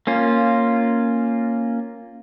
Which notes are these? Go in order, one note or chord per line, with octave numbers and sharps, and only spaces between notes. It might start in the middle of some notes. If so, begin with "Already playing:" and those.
A#3 C#4 F4